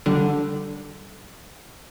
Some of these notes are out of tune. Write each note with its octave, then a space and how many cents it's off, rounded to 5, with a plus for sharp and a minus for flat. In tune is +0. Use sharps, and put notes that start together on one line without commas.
D3 +0 G3 -35